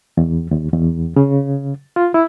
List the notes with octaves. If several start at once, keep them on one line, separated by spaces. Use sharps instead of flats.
E2
D#2
E2
C#3
F4
E4